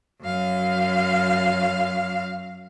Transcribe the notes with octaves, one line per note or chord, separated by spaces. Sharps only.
F#2 F5